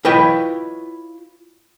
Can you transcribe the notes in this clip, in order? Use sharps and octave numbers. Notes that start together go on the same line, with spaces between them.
E4 F4 B4 C#5 D#5 G5